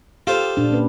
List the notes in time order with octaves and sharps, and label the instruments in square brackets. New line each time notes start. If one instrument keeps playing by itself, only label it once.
[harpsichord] F4 A4 C5 [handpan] G4
[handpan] A#2 D4
A#3 C#4 B4